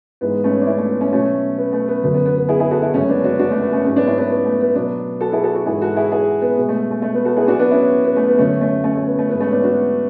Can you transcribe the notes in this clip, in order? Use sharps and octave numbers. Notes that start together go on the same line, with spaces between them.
G#2 E3 G#3 B3
A3 C#4
D4
C#4 E4
A3
B3
A3 C#4
B2 F#3 A3 C#4
B3
A3
B3
F#2 D3 F#3 B3
B3
B3
B3
E4 G#4
E4 G#4
F#4 A4
E4 G#4
F#2 C#3 G#3 A3 C#4
B3 D4
D4 F#4
D4 F#4
A3
B3
A3 C#4
G#2 F#3 A3 C#4
B3 D4
C#4 E4
B3 D4
B3
A3
B3
B2 F#3 B3 D4
F#4 A4
E4 G#4
F#4 A4
F#4 A4
G#2 E3 G#3 E4 G#4
F#4 A4
E4 G#4
E4 G#4
B3
B2 G#3
A3
A3
A3
B3
F#4 A4
E4 G#4
A2 F#3 D4 F#4
B3 D4
C#4 E4
B3
A3
B3
F#2 D3 F#3 A3 C#4
A3 C#4
A3 C#4
A3
B3
A3
G#2 E3 G#3 B3
A3 C#4
B3 D4
D4 F#4